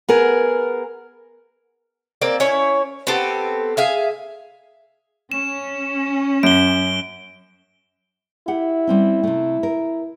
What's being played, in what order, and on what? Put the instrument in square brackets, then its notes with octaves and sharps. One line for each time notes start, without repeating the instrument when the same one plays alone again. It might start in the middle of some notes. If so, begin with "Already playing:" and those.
[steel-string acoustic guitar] B3 G#4 A#4
[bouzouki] A#3 C4 D5
C#4 E4 C#5
B3 C4 G4 A4
G#4 E5 F5
[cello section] C#4 [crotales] E7
[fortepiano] F#2 [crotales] D7 G7
[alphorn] E4 [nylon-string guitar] G4 F#5
[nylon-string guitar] G3 C4 C#4
C3 A3
A#4